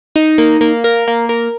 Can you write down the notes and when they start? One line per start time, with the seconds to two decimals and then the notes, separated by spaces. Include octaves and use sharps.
0.16 D#4
0.38 A#3
0.61 A#3
0.84 A#4
1.08 A#3
1.29 A#4